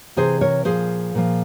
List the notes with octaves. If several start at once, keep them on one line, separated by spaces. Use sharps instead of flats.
C3 E3 G#4 C5
A#4 C#5
A#2 F3 G#4 C5
A#2 F3